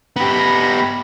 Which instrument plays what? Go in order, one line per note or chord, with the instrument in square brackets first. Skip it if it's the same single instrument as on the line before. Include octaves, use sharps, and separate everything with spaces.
[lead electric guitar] B3 G4 [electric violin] B5 A#6